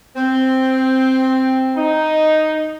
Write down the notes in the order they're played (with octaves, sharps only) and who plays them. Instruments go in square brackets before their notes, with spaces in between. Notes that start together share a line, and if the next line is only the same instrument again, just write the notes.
[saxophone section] C4
[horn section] D#4